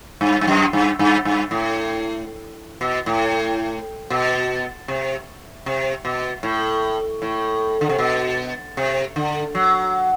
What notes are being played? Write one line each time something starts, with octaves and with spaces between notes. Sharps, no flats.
G2
G2
F#2
G2
G2
G2
A2
B2
A2
B2
C3
C3
B2
A2
A2
D3
C3
B2
C3
D3
F#3